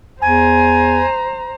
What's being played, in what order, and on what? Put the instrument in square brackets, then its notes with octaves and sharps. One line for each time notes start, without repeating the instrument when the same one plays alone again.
[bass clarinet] E2 [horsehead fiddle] C5 A#5 [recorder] G#5